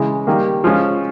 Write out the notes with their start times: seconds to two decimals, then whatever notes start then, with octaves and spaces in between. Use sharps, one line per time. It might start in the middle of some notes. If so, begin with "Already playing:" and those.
Already playing: C#3 E3 G#3
0.27 D#3 G3 A#3
0.64 F3 G#3 C#4 F4